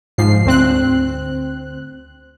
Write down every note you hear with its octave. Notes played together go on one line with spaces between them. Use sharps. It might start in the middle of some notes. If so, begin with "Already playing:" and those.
G#2 F3 C7
D2 C4 F#6